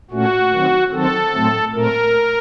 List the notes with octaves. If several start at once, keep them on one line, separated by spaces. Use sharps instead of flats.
A#2 A3 C#4 F#4
D#3 F#3 C4
D#3 F#3 C4 A4
A2 F#3 A3 C4
A#2 A3 C4 A#4